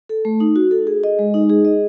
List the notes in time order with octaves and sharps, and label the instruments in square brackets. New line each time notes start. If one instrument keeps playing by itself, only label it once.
[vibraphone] A4
A3
D#4
F#4
A4
G#4
D#5
G#3
D#4
G#4
D#5